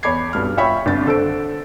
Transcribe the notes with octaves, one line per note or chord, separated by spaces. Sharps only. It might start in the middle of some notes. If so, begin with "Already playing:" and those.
E2 C#5 B5 D6 G#6 C7
B1 G2 F6
F4 C#5 E5 G5 B5 C#6
G1 C2 A6
D3 A4 C5 D7